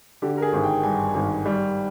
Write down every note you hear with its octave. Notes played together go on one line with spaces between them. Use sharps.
D3 G4
A#4
G#4
G#1
G5
G2 G#5
G#1
G3